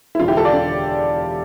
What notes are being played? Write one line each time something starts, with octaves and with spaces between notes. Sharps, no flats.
E4
E1 E2 D3 F4
E4 G4
F4 A4
D5 F5
D3